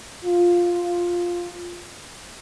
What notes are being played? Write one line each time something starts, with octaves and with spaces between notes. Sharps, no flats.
F4